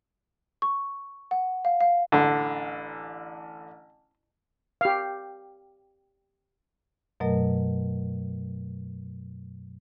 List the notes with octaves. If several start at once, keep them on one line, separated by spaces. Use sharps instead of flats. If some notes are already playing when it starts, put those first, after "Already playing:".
C#6
F#5
F5
F5
A1 D3
G4 F5
F#2 B2 F#3 A3 A#4 D#5